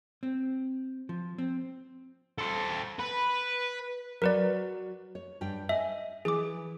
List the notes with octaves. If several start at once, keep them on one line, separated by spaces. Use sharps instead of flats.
C4
F3
C4
A4 C5
B4
F#3 A#4 B4 D5
C#5
G2 G3 G5
D#5 E5 G#5
E3 E4 G#4 D6